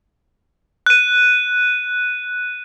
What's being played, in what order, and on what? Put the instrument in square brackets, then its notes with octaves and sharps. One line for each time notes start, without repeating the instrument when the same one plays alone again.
[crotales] F#6 D#7